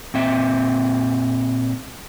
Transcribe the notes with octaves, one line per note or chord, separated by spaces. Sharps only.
A#2 C4 E5